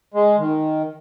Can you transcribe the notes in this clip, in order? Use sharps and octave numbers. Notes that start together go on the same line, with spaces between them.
G#3
D#3